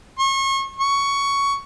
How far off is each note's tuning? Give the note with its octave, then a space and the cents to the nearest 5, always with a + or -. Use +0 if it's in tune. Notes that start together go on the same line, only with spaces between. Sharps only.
C#6 -35
C#6 +10